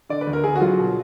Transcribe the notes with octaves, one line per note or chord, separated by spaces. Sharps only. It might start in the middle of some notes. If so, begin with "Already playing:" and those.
D3 D5
B4
D2
A#4
D3 G#4
F#4
F#3 F4
B2